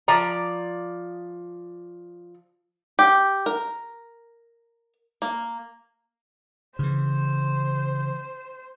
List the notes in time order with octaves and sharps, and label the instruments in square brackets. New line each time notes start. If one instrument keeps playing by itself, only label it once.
[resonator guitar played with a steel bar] F3 D5 A#5
[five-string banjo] G4
A#4
A#3
[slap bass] C#3 E3 [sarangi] C5